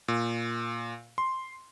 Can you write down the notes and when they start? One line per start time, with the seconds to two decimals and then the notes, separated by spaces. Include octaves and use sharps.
0.08 A#2
1.18 C6